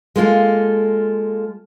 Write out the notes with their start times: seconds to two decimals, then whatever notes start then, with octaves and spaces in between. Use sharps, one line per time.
0.16 G#3 A#3 F4 A4